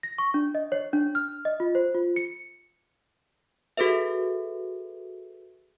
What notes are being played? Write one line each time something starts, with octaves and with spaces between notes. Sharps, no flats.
A#6
C#6
D4
D#5
C#5
D4
F6
D#5
F4
C5
F4
C#7
F#4 G#4 A4 B4 E5